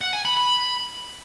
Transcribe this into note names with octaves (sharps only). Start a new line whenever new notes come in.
F#5
G#5
B5
B5